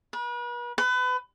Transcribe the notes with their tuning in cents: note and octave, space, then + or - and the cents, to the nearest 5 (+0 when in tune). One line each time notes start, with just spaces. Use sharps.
B4 -40
B4 +30